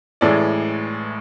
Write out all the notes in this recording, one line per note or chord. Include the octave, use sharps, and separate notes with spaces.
A1 A2 E3 G#3 D5